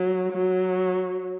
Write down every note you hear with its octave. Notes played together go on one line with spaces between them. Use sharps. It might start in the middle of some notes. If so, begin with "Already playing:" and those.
Already playing: F#3
F#3